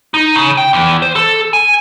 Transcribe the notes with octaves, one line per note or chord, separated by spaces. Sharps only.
D#4
C#3
G5
E2
C5
A4
G#5